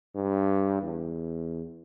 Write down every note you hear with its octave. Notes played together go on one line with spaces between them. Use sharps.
G2
E2